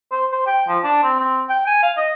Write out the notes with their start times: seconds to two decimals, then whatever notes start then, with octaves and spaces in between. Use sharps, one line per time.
0.12 C5
0.32 C5
0.47 G5
0.68 F3
0.84 D4
1.03 C4
1.19 C4
1.49 G5
1.67 G#5
1.83 F5
1.97 D#5